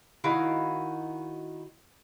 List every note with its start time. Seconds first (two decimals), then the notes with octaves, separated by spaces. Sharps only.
0.24 D#3 E4 F#4 F5